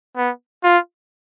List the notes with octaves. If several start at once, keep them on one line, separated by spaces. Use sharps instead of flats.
B3
F4